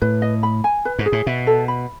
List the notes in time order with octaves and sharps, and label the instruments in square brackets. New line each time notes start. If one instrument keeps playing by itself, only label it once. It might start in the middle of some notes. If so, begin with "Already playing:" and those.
[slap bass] A2 [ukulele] B4
[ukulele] D#5
B5
G#5
B4
[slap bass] G#2
[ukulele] G#4
[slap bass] A2
[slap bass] B2 [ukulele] E5
[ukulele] A4
B5